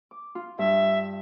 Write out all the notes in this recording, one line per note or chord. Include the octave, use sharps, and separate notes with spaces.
D6
F4
G2 E5